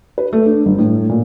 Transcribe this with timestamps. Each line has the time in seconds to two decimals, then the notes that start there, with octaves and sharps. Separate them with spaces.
0.18 B4
0.33 A3
0.46 D4
0.66 G1
0.78 A2
1.09 A#2